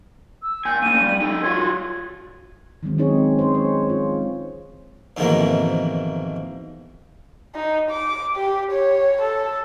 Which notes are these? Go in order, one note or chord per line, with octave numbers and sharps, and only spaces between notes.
E6
A#2 G#5 G6
A#3 C#4 D#7
G3
D#4 A4
F#3 F4 F#4 G#6
D#3 F#3 G#3 C4
G#3 C4 C#4 D#4 G#4 C#5
G#4 C5
C#5
F4
F2 G#2 B2 D#3 E3 A#3
D#4
D6
G4
C#5
A4